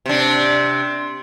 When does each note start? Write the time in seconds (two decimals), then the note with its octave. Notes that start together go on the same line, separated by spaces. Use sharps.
0.06 C3 D4